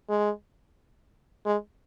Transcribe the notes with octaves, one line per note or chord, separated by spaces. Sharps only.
G#3
G#3